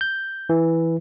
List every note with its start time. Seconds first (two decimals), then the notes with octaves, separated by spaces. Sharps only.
0.01 G6
0.49 E3